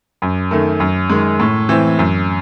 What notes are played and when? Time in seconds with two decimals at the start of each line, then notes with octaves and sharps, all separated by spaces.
0.22 F#2
0.51 D#3 A3
0.80 F#2
1.09 D#3 G#3
1.39 A2
1.69 E3 C4
1.99 F#2